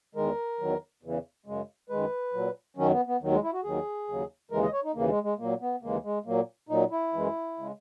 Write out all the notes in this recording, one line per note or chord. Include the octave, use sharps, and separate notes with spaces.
E2 D#3 G#3 A#4
E2 D#3 F#3
E2 C#3 E3
F#2 C#3 G#3
F#2 D#3 G#3 B4
A#2 F#3
F#2 D#3 F#3 C#4
B3
B3
D#2 D#3 F#3
G#3
E4
F#4
D#2 D#3 F#3 G#4
D#2 C#3 F#3
D#2 C#3 E3 G#3 A#4
D#5
C#5
D#4
D#2 C#3 E3 A#3
G#3
G#3
A#2 F#3 A#3
B3
D#2 C#3 E3 G#3 A#3
G#3
A#2 F#3 A#3
A#2 F#3 D#4
E4
F#2 E3 G#3
C#3 G#3